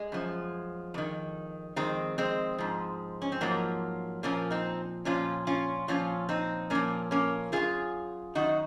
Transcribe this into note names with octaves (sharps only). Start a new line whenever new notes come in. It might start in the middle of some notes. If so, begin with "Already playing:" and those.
Already playing: G#3
F#2 F3
F2 D#3
F2 D#3 G#3 C4
G#3 C4
G#2 F3
C#4
C4
G#2 F3 F#3 A#3
A#2 F3 A#3 C#4
C4 D#4
A#2 F3 C#4 F4
C#4 F4
A#2 F3 C#4 F4
C4 D#4
A#2 F3 A#3 C#4
A#3 C#4
F#2 D#3 F4 G#4
F#2 D#3 D#4 F#4